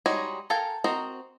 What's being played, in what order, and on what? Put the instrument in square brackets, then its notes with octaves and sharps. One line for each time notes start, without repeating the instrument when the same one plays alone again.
[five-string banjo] G3 G#3 D#4 F#4 C#5
A4 A#4 F5 G5 G#5
C4 F#4 A#4 D#5 A#5